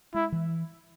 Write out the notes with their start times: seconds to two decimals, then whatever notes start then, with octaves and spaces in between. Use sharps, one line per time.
0.14 G#3 E4
0.32 E3